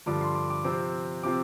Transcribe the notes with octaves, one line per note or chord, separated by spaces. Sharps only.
G2 D3 F3 D4 D6
C6
D6
D6
C3 F3 C4 D6
C3 F3 C4 D6